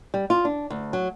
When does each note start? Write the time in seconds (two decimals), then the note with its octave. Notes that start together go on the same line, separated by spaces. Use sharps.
0.14 G3
0.30 F4
0.45 D4
0.70 D2
0.93 F#3